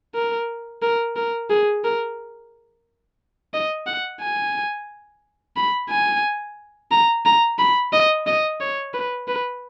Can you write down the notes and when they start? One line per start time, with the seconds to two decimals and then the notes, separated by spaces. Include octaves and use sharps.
0.15 A#4
0.82 A#4
1.16 A#4
1.50 G#4
1.84 A#4
3.54 D#5
3.87 F#5
4.21 G#5
5.57 B5
5.90 G#5
6.91 A#5
7.26 A#5
7.59 B5
7.93 D#5
8.27 D#5
8.60 C#5
8.94 B4
9.28 B4